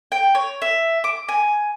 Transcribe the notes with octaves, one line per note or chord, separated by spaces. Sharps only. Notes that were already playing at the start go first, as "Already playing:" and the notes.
G5
C#5
E5
D6
G#5